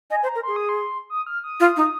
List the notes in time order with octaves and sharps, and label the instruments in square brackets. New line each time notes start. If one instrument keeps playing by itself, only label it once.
[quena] D#5 [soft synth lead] G#5
[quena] C5
[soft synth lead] A#5
[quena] A#4
[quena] G#4 [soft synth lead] C6
[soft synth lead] D#6
C6
D#6
F6
D#6
[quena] F4
D#4